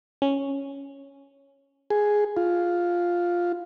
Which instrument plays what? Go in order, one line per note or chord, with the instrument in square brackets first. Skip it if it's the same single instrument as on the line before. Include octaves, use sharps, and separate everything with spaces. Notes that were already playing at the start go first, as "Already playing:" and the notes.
[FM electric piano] C#4
[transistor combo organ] G#4
F4